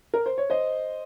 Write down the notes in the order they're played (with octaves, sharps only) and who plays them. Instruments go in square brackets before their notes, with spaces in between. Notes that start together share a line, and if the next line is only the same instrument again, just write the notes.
[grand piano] A#4
C5
C#5
C5 D#5